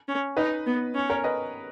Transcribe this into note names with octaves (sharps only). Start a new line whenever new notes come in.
C#4
D#4 B4 D#5
B3
C#4
A#4 C#5
B4 D#5